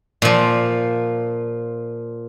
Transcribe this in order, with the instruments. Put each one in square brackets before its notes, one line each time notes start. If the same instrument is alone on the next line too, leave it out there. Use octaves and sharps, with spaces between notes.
[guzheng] A#2 F3